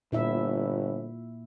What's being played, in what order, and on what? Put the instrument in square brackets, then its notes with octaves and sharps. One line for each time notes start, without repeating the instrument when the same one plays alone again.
[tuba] G1 [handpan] A#2 E4 E5